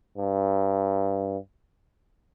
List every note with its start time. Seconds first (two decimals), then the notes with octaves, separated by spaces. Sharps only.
0.17 G2